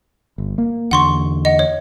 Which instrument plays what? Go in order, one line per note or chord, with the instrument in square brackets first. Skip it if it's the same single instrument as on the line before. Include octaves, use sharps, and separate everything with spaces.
[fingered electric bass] G1
A#3
[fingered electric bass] E2 D3 [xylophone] F#5 C6 C#6
[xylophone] D#5 F#5
C#5